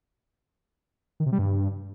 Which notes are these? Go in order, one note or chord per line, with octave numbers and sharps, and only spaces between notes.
D#3
C3
G3
G2